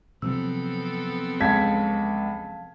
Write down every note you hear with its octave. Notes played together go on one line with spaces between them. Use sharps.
C3 F3 F#3 B3 C4 A4 E6
C#2 F5 A5 G#6 B6